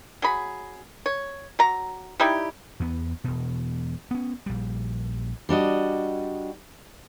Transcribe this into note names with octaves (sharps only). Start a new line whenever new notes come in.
F#3 G#4 B5
C#5
F#3 A#5
G3 D#4 E4 G4
E2 B3
E1 B2
B3 C#4
A#1 G3
G3 D4 F#4 D#5